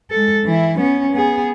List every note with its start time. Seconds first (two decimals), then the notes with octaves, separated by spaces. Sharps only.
0.11 G#3 A4
0.45 E3 E4
0.78 B3 C#4
1.12 B3 G#4